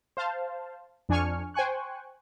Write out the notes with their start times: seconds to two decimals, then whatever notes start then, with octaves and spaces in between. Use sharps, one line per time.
0.17 C5 F5 A5
1.09 F2 D4 G#5 C#6 F6
1.54 C5 G5 G#5 C#6 F#6